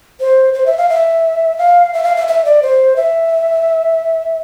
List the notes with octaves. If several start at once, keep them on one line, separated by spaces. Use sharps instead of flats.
C5
C5
E5
F5
E5
F5
E5
F5
E5
E5
D5
C5
E5